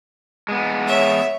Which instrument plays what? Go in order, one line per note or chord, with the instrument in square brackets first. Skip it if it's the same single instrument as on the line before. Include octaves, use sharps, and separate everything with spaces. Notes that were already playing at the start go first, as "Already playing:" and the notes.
[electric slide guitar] G#3 B3
[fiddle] C#5 E5